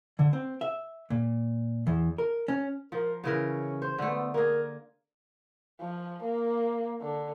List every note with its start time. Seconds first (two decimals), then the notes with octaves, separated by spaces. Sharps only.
0.19 D3
0.33 C4
0.61 E5
1.10 A#2
1.87 E2
2.18 A#4
2.48 C#4
2.92 F3 A#4
3.24 C#3 E3 C#4 A#4
3.82 C5
3.98 D3 A3 B3
4.34 A#3 G#4 A#4
5.81 F3
6.22 A#3
7.01 D3